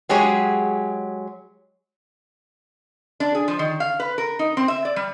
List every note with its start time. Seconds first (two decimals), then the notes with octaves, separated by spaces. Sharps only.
0.09 F#3 G#3 G4 G#4 C#5
3.20 D4
3.35 G#4
3.48 F3
3.59 D#3
3.80 F5
4.00 B4
4.18 A#4
4.39 D#4
4.57 C4
4.68 E5
4.85 D5
4.96 G3